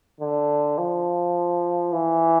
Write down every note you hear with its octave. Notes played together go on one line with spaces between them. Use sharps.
D3
F3
E3